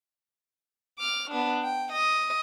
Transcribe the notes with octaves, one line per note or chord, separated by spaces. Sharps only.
D6 F6
B3 D4
G5
D#5